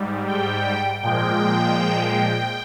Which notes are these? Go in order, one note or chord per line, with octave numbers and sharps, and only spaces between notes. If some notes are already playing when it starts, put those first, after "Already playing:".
Already playing: G#2 G3
G5
A#2 F3 G#3 G5